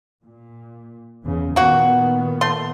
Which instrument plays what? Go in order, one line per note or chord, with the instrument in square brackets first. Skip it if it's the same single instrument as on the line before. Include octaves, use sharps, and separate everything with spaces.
[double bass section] A#2
E2 C#3 E3
[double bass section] A#2 D#3 B3 [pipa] A#3 F#4
[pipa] A3 C6